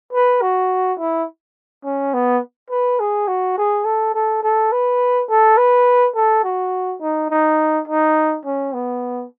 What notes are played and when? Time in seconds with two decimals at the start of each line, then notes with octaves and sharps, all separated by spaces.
0.13 B4
0.41 F#4
0.99 E4
1.85 C#4
2.14 B3
2.70 B4
3.00 G#4
3.28 F#4
3.57 G#4
3.85 A4
4.14 A4
4.43 A4
4.72 B4
5.29 A4
5.57 B4
6.16 A4
6.44 F#4
7.01 D#4
7.30 D#4
7.88 D#4
8.45 C#4
8.74 B3